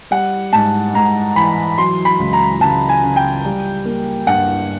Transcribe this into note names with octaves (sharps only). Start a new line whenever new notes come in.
G3 F#5
G#2 A5
G#2 A#5
E3 B5
F#3 C6
B5
C#2
A#5
C#2 A5
G#5
C#3
G5
G3
A#3
G2 F#5